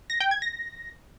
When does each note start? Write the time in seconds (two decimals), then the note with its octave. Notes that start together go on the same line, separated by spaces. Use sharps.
0.10 A#6
0.20 G5
0.31 G#6
0.42 A#6